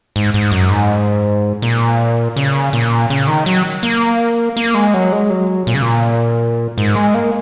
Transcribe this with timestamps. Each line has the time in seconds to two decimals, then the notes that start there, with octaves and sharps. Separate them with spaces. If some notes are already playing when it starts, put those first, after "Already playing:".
0.16 G#2
0.34 G#2
0.51 F#2
0.70 G#2
1.62 A#2
2.36 C#3
2.73 A#2
3.10 C#3
3.27 D#3
3.46 F#3
3.83 A#3
4.57 A#3
4.74 G#3
4.94 F#3
5.12 G#3
5.30 F#3
5.67 A#2
5.75 C#3
5.82 A#2
6.78 G#2
6.96 G#3
7.14 A#3